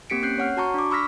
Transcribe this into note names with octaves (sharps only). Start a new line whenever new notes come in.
A#3 C4 G4 B6 C#7 D7
C#4 F#6 G6 C7
C#5 F#5 F6
F#4 A5 A#5 C#6
D4 D6
B5 C#6 E6 F6 A#6 B6